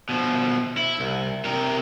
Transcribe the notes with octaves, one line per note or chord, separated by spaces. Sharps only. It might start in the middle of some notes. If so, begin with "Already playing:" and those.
B2 F3
E4
C2
C3 A#4